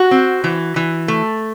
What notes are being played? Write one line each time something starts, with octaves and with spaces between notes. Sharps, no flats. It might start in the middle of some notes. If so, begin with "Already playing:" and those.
Already playing: F#4
C4
E3
E3
A3